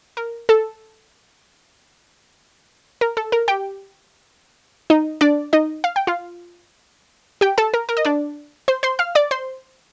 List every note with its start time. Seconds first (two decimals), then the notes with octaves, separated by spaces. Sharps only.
0.17 A#4
0.49 A4
3.01 A#4
3.17 A4
3.32 A#4
3.48 G4 G5
4.90 D#4 D#5
5.21 D4 D5
5.53 D#4 D#5
5.84 F5
5.96 G5
6.07 F4 F5
7.41 G4 G5
7.58 A4 A5
7.74 A#4
7.89 A#4
7.97 D#5
8.05 D4 D5
8.68 C5 C6
8.83 C5 C6
8.99 F5 F6
9.15 D5 D6
9.31 C5 C6